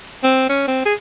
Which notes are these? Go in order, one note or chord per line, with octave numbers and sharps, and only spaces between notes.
C4
C#4
C4
G#4